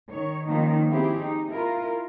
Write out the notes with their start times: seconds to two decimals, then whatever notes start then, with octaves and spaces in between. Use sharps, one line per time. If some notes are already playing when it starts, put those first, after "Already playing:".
0.10 D#3 C#5
0.47 D#3 F3 A#3 C#4 D#4
0.90 C4 E4 G4 G#4
1.20 D#4
1.52 E4 F4 A#4